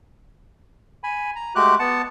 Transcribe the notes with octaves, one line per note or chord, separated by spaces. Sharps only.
G#5 B5
A#5
G#3 A3 F#4 G4 D6 F#6
B3 F#5 A5